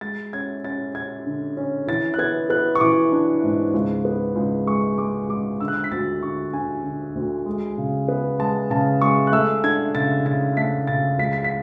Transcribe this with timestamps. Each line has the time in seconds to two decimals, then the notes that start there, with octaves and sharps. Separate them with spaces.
0.01 G#3 A6
0.33 C#4 G#6
0.64 C#4 A6
0.95 C#4 G#6
1.27 D3
1.57 C#4
1.87 E3 A6
2.14 F#6
2.18 B3 G#6
2.50 B3 F#6
2.75 C#6
2.81 E3 D6
3.12 D4
3.44 G#2
3.74 C#2
4.05 B3
4.36 C#2
4.67 G#3 C#6
4.98 G#3 D6
5.29 G#3 D6
5.60 D3 E6
5.68 F#6
5.76 E6
5.84 B6
5.91 D2 A6
6.23 D3 C#6
6.53 D3 G#5
6.84 D3
7.15 D2
7.46 G#3
7.78 C#3
8.08 B3
8.39 G#3 A5
8.70 C#3 A5
9.01 G#3 C#6
9.27 F#6
9.32 A3 E6
9.64 D4 G#6
9.95 C#3 A6
10.25 C#3 A6
10.57 A3 B6
10.87 C#3 A6
11.18 C#2 B6
11.33 B6
11.44 B6